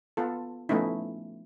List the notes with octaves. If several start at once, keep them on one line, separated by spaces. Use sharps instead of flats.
B3 F4 A4
F3 A3 B3 C#4 D#4 E4